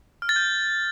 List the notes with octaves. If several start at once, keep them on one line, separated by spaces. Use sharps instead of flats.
F6
A6
G6